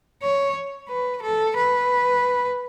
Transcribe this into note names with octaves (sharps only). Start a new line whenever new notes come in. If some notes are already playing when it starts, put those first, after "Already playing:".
C#5
B4
A4
B4